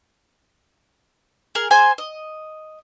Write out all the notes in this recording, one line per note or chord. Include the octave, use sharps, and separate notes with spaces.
G#4 A#4
G#4 C5 G#5
D#5